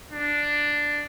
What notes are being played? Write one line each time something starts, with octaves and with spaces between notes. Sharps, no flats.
D4